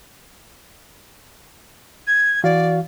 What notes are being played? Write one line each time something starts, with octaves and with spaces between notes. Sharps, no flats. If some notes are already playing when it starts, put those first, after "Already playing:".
G#6
E3 F#4 D5 F5